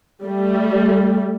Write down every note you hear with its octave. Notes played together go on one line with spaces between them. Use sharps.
G3 A3